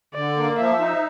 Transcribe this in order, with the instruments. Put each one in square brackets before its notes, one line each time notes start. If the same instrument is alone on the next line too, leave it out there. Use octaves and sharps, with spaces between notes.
[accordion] D3 [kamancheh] D5
[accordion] A#3
[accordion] F3 [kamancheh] E5
[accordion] D#4